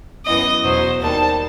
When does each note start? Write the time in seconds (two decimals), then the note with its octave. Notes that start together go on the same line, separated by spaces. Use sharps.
0.26 F#2 E3 B3 D#5
0.64 E2 B2 F#3 C5
1.02 D#2 D#3 G3 A5